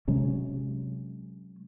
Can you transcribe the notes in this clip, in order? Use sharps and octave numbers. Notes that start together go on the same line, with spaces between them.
C3 F#3 G#3 C#4